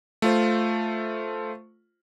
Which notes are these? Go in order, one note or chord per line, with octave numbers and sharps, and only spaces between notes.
A3 F4 C5